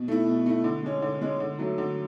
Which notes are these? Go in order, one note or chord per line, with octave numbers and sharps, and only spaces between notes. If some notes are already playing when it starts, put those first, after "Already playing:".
Already playing: B2
A3 E4
B2
A3 E4
D3
G#3 C#4
D3
G#3 C#4
D3
F#3 A3
D3